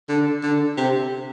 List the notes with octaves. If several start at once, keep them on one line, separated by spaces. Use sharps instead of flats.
D3
D3
C3